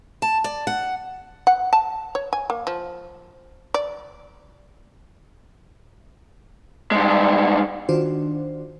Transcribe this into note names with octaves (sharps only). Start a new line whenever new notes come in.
A5
D5
F#5
F#5
A5
C#5
G#5
A#3
F3
D5
G2 G#3
D#3 D4 F4 F#4 C5